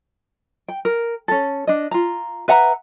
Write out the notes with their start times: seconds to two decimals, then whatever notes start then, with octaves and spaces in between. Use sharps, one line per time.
0.68 G5
0.85 A#4
1.28 C#4 A4
1.67 D4 D#5
1.91 F4 A#5
2.48 B4 E5 F#5 A#5